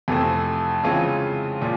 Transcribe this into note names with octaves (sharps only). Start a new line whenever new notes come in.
F2 C3 E3 A3 C4
C#3 E3 G#3 C4 F4
A#2 F3